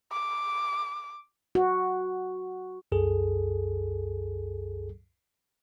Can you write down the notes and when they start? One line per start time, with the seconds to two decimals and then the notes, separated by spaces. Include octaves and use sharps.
0.12 D6
1.55 F#4
2.92 C2 F#2 G#4 A4